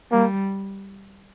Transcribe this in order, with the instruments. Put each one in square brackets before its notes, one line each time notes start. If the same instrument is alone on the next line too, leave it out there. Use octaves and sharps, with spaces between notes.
[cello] G3 [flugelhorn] A#3